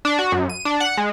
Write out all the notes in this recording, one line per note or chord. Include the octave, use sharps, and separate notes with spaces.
D4
F#4
F#2
D#7
D4
F#5
G#3